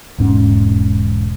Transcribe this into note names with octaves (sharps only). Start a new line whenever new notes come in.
E1 G#2 C#4